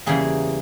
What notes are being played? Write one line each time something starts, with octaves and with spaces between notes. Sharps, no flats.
E2 C#3 E3 G3 A#3 G#4